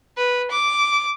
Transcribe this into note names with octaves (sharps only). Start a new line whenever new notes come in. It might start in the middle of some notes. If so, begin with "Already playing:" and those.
B4
D6